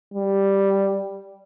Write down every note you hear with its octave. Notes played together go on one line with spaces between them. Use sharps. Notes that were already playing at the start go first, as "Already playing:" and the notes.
G3